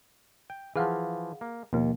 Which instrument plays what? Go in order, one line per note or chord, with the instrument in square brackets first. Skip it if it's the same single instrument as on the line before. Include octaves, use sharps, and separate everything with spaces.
[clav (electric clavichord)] G5
[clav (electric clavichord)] E3 F3 [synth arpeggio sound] G#4 F5 F#5
[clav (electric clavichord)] A#3
[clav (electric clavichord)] D#2 [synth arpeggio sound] B2 F3 A#3